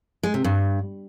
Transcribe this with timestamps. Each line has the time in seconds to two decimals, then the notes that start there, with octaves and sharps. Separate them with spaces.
0.23 G#3
0.34 C3
0.44 G2